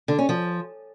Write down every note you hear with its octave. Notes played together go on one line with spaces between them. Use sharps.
D3
C#4
F3